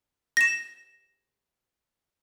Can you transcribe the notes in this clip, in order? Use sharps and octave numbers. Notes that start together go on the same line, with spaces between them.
A#6 E7